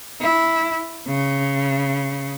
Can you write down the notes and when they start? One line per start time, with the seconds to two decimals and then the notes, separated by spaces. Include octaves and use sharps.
0.21 E4
1.08 C#3